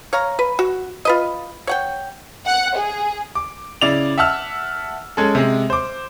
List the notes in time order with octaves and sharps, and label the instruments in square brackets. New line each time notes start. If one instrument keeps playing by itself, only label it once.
[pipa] C#5 F5 A#5
B4
F#4
F4 B4 D#5
C#5 F#5 G5
[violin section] F#5
G#4
[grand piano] D6
C#3 E4 D5 F7
E5 F#5 A5 E6 F6
G#3 C#4 A4
C3 G#3
C5 D6